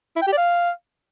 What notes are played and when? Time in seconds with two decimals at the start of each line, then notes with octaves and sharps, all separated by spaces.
0.16 E4
0.22 G5
0.27 G4
0.33 D5
0.38 F5